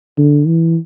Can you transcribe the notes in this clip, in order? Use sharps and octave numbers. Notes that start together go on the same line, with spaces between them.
D3
E3